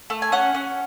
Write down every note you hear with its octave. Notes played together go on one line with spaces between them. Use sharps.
A3
G#5
C#4 F#5
C#4